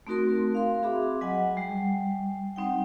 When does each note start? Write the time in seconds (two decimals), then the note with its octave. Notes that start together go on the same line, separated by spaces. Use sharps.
0.07 A3 C4 D#4 F#4 A#4 C6
0.55 F5 C6
0.83 C4 F#4 G#4 E5 B5 D6
1.21 F#3 D#5 F#5 G#5
1.57 G3 G#5
2.56 G3 C4 D#4 F#5 G5